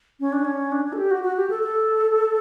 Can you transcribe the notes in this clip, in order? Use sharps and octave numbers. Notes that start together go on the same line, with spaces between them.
C#4
D4
C#4
D4
D4
A4
G4
F#4
F#4
G4
A4
A4